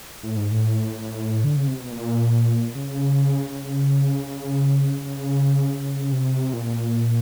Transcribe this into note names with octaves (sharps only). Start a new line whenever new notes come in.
A2
G#2
A2
D3
C#3
C3
B2
A#2
C#3
C3
A#2